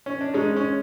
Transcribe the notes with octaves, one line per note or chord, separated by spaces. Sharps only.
C#4
D4
G#3 C#4 D#4
C#4